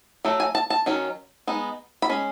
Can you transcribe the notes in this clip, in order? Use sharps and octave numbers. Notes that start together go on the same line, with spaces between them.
F#3 A3
G#5
A5
A5
D#3 F#3 C#4
G#3 B3 D#4
B5
G#3 C#4